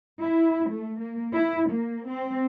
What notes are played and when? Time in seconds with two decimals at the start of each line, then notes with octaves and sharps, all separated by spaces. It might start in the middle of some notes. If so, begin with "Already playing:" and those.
0.21 E4
0.69 A3
1.00 A#3
1.35 E4
1.70 A#3
2.09 C4